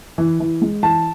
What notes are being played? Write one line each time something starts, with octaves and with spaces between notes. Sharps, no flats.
E3
E3
G#3
E3 A5